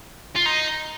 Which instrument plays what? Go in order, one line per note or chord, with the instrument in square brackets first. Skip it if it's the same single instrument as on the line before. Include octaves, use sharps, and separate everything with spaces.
[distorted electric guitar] F4
D#4